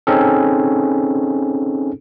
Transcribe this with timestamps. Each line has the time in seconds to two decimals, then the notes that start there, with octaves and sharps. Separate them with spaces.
0.07 C4 C#4 D#4 G#4 A4